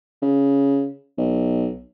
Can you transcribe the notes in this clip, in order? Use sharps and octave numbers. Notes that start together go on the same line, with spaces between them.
C#3
B1